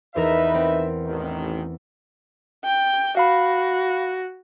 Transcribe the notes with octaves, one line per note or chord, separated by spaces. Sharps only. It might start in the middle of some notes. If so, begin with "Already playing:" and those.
E2 D#4 A#4 B4 E5
C4
A1 D#3
G5
F#4 F5 B5